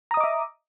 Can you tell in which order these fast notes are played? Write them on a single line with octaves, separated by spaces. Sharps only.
A#5 D#6 D#5 D6 E5